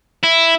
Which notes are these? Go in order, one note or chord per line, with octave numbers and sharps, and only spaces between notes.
E4